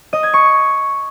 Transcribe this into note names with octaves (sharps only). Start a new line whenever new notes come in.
D#5
G#6
C#6